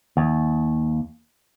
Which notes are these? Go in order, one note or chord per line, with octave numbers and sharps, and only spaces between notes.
D#2